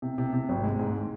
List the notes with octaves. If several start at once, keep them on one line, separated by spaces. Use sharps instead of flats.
C3
C3
C3
G#1
G#3
G#2